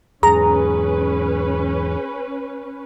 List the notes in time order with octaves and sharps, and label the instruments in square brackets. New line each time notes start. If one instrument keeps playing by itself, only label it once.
[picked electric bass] E2 G#2 [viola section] C#4 B4 [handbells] G#4 [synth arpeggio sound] A#5